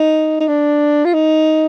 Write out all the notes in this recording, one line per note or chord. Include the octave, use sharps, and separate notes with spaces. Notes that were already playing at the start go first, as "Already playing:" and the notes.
Already playing: D#4
D#4
D4
F4
D#4